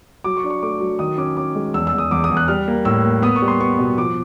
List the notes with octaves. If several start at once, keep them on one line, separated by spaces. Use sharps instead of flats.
F#3 D6
C#6
D4
C#6
A3 D6
F#3
D#3 D#6
C#4 D6
C#4 D6
G#3
E2 E6
E6
E2
D#6
E2 D6
D#6
E2
F#6
G3 F6
A#3
A2 E6
A#3
B3 D#6
C#6
G3
C6
B3 C#6
B2
F3 D6